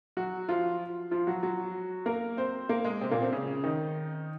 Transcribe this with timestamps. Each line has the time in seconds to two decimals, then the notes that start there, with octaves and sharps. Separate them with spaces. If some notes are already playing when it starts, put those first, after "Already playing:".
0.17 F#3 F#4
0.49 F3 F4
1.11 F3 F4
1.27 F#3 F#4
1.43 F#3 F#4
2.06 A#3 A#4
2.37 C4 C5
2.69 A#3 A#4
2.84 G#3 G#4
3.01 C3 C4
3.11 A#2 A#3
3.21 C3 C4
3.33 C#3 C#4
3.63 D#3 D#4